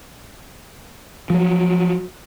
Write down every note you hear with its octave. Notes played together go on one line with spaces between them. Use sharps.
F3 F#3